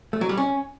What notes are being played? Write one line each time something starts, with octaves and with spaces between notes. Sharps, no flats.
A3
F#3
G3
C#4